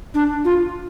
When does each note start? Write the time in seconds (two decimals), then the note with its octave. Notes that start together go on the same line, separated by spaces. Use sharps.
0.14 D4
0.45 F4